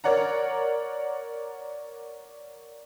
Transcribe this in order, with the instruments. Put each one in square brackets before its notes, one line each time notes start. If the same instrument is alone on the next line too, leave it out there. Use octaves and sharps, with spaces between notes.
[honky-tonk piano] A#4 C#5 D5 F#5 A#5